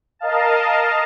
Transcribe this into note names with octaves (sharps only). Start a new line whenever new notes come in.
A#4 D#5 F5 A5